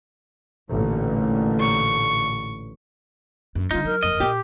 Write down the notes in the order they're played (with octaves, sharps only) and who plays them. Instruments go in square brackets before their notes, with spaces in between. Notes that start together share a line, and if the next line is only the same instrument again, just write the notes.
[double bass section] A1 A#2 D3
[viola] C#6
[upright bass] F#2
[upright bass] D3 G3 [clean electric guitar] D#4 [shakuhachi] F4
[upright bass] F#3 [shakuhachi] A#4
[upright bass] F#1 F2 [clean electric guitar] D#5
[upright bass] A#2 [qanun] G4